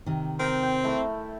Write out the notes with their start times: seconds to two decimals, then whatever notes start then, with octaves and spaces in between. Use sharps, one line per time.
0.06 C3 D#3
0.39 C4 A#4 G5
0.63 G5
0.84 A3 E4